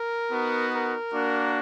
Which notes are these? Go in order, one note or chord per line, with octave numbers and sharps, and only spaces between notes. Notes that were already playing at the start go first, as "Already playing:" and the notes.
Already playing: A#4
B3 D#4 F#4
A#4
A#3 D4 F#4